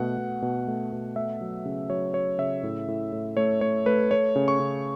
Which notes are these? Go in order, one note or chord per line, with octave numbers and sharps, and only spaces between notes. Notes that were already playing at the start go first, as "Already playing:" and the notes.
Already playing: B2 A3 F#5
B2
B2
A3
B2
A3 E5
F#3
C#3
F#3 C#5
F#3 C#5
C#3 E5
A2
A2
A2
A3 C#5
A3 C#5
A3 B4
A3 C#5
C#3
C#6
C#3